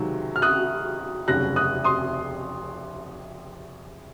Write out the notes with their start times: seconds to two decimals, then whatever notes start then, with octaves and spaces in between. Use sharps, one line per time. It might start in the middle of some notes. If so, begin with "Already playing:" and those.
Already playing: C#2 C3 D#3 F#3
0.36 F6
0.42 D#6 F#6
1.28 F1 D#2 C#3 F#3 F#6 A#6
1.56 D#6 F#6
1.84 C6 D#6